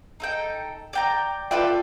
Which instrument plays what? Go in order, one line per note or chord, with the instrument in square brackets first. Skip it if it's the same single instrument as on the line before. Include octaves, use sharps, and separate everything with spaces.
[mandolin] D#4 A4 G5
D5 G5 A#5
[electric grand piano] F4 E5 G5 [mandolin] A4 B4 D5